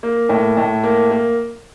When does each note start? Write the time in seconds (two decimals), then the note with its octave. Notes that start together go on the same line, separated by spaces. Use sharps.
0.03 A#3
0.29 A2
0.57 A2
0.83 A#3
1.11 A#3